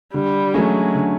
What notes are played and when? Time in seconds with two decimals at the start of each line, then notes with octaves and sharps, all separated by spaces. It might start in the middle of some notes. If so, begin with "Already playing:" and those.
0.14 D3 G3
0.54 F#3 G#3 A3 C#4
0.95 D3